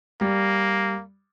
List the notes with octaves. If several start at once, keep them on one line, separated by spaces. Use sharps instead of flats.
G3 A#3